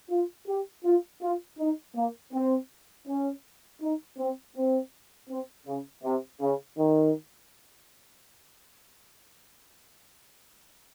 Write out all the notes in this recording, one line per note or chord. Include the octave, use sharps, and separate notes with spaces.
F4
G4
F4
F4
D#4
A#3
C4
C#4
D#4
C4
C4
C4
C#3
C3
C#3
D#3